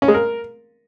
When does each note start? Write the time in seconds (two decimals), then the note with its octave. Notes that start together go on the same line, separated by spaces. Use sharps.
0.02 C#4
0.08 G#3
0.14 A#4